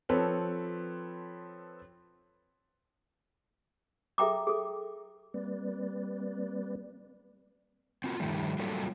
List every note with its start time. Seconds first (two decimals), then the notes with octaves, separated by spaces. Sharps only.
0.09 F3 C4 A4 B4 C#5
4.18 G#4 A4 E5 G5 A#5 D6
4.47 G#4 A4
5.34 G3 A#3 C4 B4 D5
8.04 C4 F4 F#4
8.20 G2 D#3 F3 G3 A3
8.59 F#3 G3 A#3 F4 A4